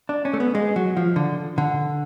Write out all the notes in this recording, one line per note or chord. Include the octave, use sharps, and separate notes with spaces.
D4
C#4
A3
B3
G#3
F#3
F3
D3
D3